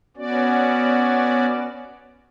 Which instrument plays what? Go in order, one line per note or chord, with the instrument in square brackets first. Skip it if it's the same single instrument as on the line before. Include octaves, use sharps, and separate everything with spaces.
[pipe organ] B3 C#4 F#4 D5